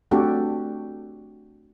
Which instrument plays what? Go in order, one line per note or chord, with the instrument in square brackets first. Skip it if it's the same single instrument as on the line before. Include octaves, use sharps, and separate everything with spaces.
[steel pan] A3 C4 D4 F#4 G4 A4